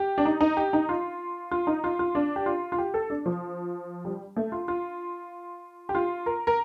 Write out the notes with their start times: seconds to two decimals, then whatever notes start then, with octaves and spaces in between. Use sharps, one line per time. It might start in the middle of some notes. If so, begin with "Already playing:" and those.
Already playing: G4
0.18 D4
0.25 D#4
0.41 D#4
0.57 G4
0.73 D#4
0.89 F4
1.51 F4
1.67 D#4
1.84 F4
1.99 F4
2.15 D4
2.36 G4
2.46 F4
2.72 F4
2.78 G4
2.94 A4
3.10 D4
3.26 F3
4.05 G3
4.37 A3
4.52 F4
4.68 F4
5.89 G4
5.95 F4
6.26 A#4
6.47 A#4